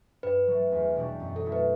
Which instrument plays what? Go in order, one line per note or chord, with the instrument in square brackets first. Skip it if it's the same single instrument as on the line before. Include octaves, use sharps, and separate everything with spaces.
[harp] G2 [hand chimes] B4
[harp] F#3 A3
E2
B2 G3 D4 F#4
F#2
[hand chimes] A4
[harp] F#3 A3 E4
[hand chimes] B4